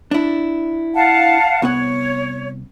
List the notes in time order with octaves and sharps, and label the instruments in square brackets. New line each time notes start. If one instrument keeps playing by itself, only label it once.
[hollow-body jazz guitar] D4 E4
[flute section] F5 F#5 A5
[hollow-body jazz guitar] C2 B3 F#5 [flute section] C#5